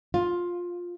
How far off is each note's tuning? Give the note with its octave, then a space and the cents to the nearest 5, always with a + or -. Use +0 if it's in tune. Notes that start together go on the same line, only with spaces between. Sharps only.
F4 +10